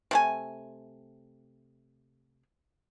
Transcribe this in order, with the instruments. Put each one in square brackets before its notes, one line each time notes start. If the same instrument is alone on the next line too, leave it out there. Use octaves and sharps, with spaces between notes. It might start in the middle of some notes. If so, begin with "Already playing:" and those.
[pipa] C3 A3 G#5